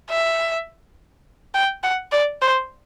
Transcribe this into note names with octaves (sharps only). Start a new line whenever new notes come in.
E5
G5
F#5
D5
C5